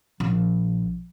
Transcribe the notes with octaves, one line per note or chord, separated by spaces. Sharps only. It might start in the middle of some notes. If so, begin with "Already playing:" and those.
A#1